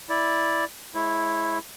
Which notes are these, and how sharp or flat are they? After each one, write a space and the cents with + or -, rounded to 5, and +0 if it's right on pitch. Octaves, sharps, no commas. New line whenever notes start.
E4 +0 D5 +0
G#3 +25 E4 +0 C#5 -30